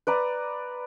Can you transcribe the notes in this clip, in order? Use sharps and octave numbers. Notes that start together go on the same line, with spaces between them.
B4 D5 A#5